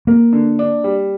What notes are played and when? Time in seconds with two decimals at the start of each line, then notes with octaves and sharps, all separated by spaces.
0.07 A#3 A#4
0.33 D3
0.59 D4
0.84 G3